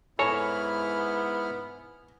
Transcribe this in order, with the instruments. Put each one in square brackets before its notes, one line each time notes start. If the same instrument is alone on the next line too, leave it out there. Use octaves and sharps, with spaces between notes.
[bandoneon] G#2 E4 F6 [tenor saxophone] B3 [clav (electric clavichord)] A4 C#5 A#5 [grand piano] G#5